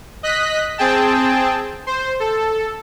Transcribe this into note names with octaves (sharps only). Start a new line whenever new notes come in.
D#5 F#6 B6
C4 G#4 G5 A5
C5
A4